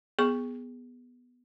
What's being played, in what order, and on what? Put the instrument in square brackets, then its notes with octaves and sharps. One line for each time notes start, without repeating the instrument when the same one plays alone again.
[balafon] B3 G#4 C#6